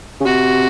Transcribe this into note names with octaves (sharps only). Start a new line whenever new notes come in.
C#3
C3 F#4